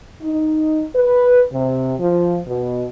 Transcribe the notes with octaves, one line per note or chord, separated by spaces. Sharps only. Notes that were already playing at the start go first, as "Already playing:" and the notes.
D#4
B4
C3
F3
B2